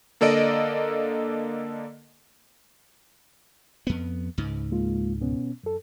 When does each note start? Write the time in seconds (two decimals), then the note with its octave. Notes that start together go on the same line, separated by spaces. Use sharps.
0.21 D3 A#3 A4 D5 D#5 D7
3.87 F2 B3
4.38 C#2 G#2
4.71 G#3 A#3 F4
5.21 B2 B3 C#4
5.64 F#2 A4